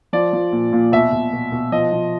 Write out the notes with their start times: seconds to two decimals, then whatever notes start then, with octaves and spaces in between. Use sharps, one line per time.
0.13 F3 D5
0.33 F3
0.52 A#2
0.73 A#2
0.92 B2 E5
1.12 B2
1.33 B2
1.52 B2
1.72 F3 D#5
1.92 F3